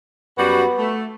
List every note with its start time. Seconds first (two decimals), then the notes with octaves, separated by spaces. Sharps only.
0.38 F#2 G3 B3 F#4
0.78 A3